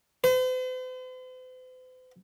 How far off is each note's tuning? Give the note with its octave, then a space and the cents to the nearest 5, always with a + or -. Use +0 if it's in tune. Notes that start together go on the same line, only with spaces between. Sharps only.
C5 -45